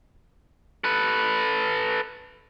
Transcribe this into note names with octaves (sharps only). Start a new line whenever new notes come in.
A4 B4